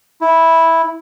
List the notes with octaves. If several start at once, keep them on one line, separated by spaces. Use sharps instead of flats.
E4